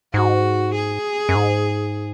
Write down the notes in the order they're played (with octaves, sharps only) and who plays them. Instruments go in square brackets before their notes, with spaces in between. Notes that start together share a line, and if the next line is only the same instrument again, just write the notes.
[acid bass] G#2 [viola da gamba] F#4
[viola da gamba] G#4
[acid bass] F#2
G#2